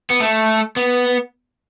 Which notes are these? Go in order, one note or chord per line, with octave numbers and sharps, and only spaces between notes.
B3
A3
B3